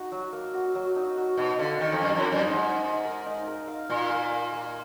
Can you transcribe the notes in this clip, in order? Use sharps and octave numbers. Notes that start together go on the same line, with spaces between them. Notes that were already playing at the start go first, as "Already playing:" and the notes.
Already playing: D#4 F#4
F#3
A#3
F#4
F#3
D#4
F#4
B2 D#4
D3 F5
D#3 F5
F2
F#2 F5
F2
D#4
F#2
D#4
G#2
D#4
D#4
A#4
D#4
A#4
F5
A#2 F4
A#4
A#3
A#3